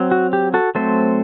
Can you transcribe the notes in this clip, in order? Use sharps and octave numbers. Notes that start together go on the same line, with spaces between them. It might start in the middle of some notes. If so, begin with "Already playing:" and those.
Already playing: F#3 C4
F#4
G4
F#4 A4
F#3 A3 C4 A4 C5